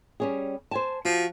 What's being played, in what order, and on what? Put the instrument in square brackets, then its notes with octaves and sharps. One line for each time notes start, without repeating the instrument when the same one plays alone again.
[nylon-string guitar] G3 C#4 G#4
C5 G#5 A5
[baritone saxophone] F3 [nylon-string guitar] F#4